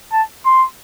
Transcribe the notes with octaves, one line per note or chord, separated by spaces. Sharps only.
A5
C6